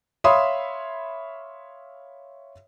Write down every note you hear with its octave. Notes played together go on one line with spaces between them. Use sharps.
C#5 E5 F5 B5 C6 D#6